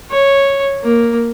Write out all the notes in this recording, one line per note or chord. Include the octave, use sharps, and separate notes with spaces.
C#5
A#3